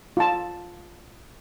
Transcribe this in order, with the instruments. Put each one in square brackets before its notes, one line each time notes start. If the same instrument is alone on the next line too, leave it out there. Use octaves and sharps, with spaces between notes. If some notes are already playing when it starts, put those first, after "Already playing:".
[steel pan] F4 A5